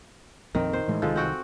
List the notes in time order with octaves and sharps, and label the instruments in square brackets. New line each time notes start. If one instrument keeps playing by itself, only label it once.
[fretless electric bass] A#1 F2 C4 [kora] D#3
[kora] C5
[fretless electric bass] A2 E3 G#3
[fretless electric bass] C2 D#3 [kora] F3 G#3 A4
[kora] C4 F#4 G5